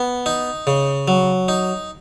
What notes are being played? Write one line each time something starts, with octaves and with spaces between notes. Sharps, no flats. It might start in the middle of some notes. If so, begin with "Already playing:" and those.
Already playing: B3
D#4
C#3
F#3
D#4